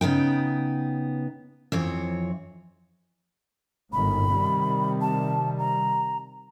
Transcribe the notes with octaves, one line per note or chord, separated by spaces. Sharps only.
C#3 B3 D#4 G5
F2 E3 C4 C#5
G1 G#2 D#3 B5
C3 D#3 G3
A5
A#5